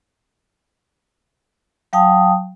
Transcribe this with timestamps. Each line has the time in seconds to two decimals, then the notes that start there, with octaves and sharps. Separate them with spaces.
1.93 F#3 F5 G5 A5 D#6